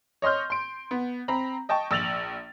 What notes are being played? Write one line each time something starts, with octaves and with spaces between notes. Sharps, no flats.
C#5 D#5 C6 F6 G6
C6 D7
B3
C4 A#5 B5
D#5 G5 A5 C#6
A#1 E6 A6 F7 F#7